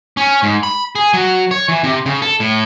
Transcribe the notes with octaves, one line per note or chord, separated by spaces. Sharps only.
C#4
G#2
B5
G#4
F#3
C#5
E3
C3
C#3
A4
A2